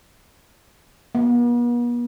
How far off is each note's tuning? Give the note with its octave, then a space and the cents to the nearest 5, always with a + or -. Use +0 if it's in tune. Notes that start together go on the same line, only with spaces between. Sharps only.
B3 -45